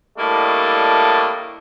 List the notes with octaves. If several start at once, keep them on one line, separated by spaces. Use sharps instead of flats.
A2 G3 A3 A#3 D4 D#5